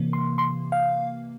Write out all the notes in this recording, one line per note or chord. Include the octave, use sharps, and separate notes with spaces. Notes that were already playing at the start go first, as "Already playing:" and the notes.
Already playing: C3 E3 A#3
C6
C6
F5